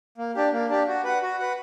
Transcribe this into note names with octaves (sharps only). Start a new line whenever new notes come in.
A#3
D4 G4
A#3
D4 G4
F#4
B4 F#5
F#4
B4 F#5